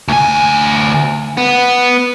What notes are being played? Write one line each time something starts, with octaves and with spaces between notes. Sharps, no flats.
D2 G#5
B3